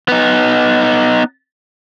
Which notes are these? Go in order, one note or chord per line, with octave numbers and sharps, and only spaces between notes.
B3 D#4